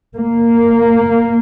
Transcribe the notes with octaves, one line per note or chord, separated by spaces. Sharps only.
A#3